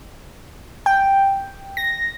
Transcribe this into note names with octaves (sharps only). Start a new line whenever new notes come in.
G5
A#6